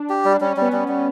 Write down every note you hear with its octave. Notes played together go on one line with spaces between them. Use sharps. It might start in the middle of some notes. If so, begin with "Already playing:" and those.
Already playing: D4
G4
G3
G3 C#4
G3 B3
G3
G3